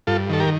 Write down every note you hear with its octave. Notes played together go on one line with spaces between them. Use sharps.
G2 F4 A4
D#3 A4
G4 A#4